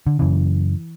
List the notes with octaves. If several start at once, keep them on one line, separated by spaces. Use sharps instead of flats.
D3
F#2 C#3 E3